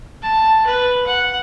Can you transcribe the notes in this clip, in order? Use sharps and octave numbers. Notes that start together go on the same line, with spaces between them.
A5
B4
F#5